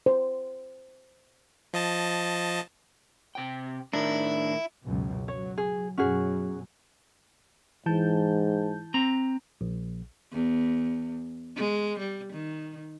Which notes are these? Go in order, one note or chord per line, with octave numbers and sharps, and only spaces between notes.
C5
F3 D#5 A5
C3 G5
A2 D#3 D4 E4 A#4
C#2 F#2 B2
F#3 C#5
G#4
F#2 B2 F#3 C#4 F#4 G#4
G#2 E3 A5 G6
C4 A#5
A#1
E2
G#3
G3
D#3